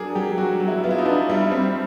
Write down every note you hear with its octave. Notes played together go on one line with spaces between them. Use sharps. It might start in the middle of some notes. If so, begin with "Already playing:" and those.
Already playing: F#3 D4 G#4 A#4
F#3 G4
F#3 F#4
F#3
E4
B3 F4
E4
D#4
D4
G3 E4
C4